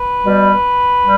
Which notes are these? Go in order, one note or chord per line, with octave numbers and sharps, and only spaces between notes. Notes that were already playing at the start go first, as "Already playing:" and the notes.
Already playing: B4
B2 G3
G3